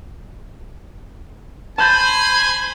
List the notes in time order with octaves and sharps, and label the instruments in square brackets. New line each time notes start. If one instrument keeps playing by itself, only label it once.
[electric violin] C5 B5 [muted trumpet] G#5 [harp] A5 G6 A6